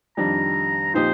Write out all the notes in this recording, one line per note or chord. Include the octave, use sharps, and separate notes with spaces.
F2 D#3 G3 D4 A#5
A#2 F3 C4 D#4 G4 C5